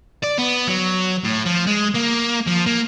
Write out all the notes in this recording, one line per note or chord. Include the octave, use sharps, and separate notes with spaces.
D5
B3
F#3
A2
F3
G#3
A#3
F3
A#3